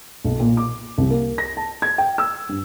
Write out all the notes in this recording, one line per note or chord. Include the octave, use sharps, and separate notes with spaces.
B1
A#2
D6
C2
A#3
A#6
A5
G#6
G5
E6
G2